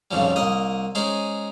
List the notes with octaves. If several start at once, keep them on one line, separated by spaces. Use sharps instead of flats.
B1 F2 C#3 F3 G3
C2 A#3 D#5 D#6
G#3 C#4 D#4 G#4 C5